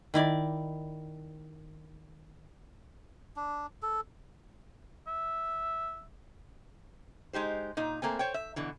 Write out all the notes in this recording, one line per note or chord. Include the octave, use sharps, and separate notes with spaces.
D#3 E4 D5
D4
A4
E5
G#3 D#4 G4 C5
A#2 D#4
A3 A#3 C4 G#5
C5 C#5 G5
E5
B2 D3 E3